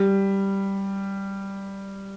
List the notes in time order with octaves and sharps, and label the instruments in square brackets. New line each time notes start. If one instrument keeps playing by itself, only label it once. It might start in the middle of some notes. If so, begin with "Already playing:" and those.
Already playing: [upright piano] G3